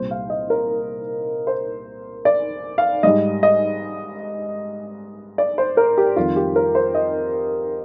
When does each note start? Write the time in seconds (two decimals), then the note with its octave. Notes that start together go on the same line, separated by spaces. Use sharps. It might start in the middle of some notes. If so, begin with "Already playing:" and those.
Already playing: C2 A#2 G3 C5
0.11 F5
0.30 D#5
0.50 A#4
1.47 C5
2.25 D5
2.78 F5
3.03 G#2 G3 D#5
3.43 D#5
5.38 D5
5.58 C5
5.77 A#4
5.98 G4
6.16 F2 D#3 G3 F4
6.36 G4
6.56 A#4
6.75 C5
6.95 D#5